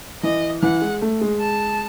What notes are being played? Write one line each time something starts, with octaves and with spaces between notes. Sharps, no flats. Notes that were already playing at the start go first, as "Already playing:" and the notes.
E3 D#5
E3 F#5
G#3
A3
G#3
A5